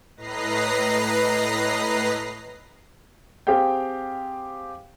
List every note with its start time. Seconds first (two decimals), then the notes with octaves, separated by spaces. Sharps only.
0.17 A2 B4 D#5 A#5 A#6 C7
3.47 C4 G4 G#4 F5 G5